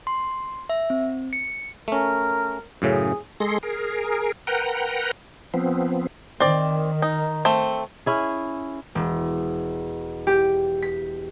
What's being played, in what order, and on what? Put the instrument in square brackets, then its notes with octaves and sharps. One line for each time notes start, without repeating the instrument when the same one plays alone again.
[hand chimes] C6
E5
C4
C#7
[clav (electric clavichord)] A3 C#4 [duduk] A#4
[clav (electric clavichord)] F#2 A2 C#3 [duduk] G#4
[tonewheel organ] G#3 G#4 A4 C6 A#6
G#4 A#4
A#4 B4 F#5 G5 A#5
F3 B3 C4
[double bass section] D#3 [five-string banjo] C4 D5
[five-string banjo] D#4
A3 C4
[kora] C#4 E4 G#4
[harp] E1
G4
B6